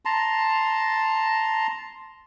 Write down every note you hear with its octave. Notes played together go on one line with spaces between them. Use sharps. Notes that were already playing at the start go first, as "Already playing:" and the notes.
A5 A#5 C6